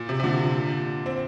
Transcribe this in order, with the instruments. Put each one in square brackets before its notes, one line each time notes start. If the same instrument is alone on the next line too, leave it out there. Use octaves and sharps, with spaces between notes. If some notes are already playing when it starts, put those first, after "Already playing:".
Already playing: [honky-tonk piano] A#2
C3
C3
A#2 D3
C4